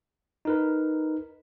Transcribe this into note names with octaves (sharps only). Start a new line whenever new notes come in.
D#4 A#4 B4